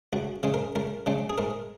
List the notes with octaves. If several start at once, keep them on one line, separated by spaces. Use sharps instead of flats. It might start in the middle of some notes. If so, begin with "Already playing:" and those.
C#2 F#4
C#3 G#3 C#4
A#4
C#2 A#4
C#3 G#3 C#4
G#4
G#2 A#4